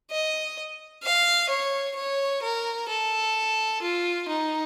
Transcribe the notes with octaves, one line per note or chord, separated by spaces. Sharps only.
D#5
F5
C#5
C#5
A#4
A4
F4
D#4